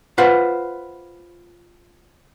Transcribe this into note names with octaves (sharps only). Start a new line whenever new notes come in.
F4 B4 C5 F#5